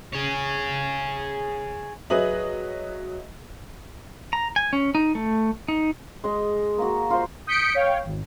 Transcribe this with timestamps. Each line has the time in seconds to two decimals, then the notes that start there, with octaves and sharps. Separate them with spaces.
0.13 G#4 C#5
2.10 F#3 G#4 B4 D#5 E5 F#7
4.33 A#5
4.56 G#5
4.73 C#4
4.95 D#4
5.15 A3
5.68 D#4
6.24 G#3 D#5
6.78 A#3 F#4
7.10 F4 C5
7.47 D#6 G6 B6 C#7 D7
7.75 C#5 F5 G5
8.05 G#1